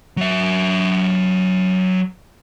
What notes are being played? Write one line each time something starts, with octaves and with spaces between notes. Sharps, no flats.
F#3 E5